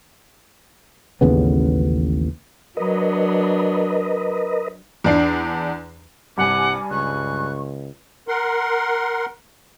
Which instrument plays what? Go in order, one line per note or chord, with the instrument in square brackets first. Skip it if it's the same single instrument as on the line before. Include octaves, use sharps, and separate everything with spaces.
[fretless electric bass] A1 D#2 C#3 B3
[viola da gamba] F#3 D4 [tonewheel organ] A#4 B4 D#5
[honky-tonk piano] E2 D4 C7
[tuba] C2 [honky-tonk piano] G2 G#5 [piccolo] F#5 [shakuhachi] D6
[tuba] C#2 [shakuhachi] C#6 [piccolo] F#6
[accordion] A#4 F#5 C6